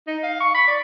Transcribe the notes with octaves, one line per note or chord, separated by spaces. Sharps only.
D#4
F5
C#6
B5
D5